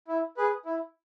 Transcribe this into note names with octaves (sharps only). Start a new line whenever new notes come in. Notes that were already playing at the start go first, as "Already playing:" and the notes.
E4
G#4 B4
E4